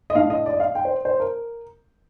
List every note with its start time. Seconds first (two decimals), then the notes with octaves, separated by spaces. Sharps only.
0.10 D#5
0.15 A2 A3 D4 F5
0.30 D#5
0.46 D5
0.53 D#5
0.60 F5
0.75 G5
0.85 C5
1.05 C5
1.20 A#4